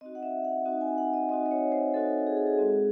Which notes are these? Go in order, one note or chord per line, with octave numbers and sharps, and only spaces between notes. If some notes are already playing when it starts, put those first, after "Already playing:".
C4 D#4 F#4 D#5
F#5
E5
F#5
C4 D#4 F#4
G#5
F#5
D#5
C4 D#4 F#4 D#5
D#5
C#5
C5
C4 D#4 F#4 A4
G#4
A4
G#4
G#3 C4 F#4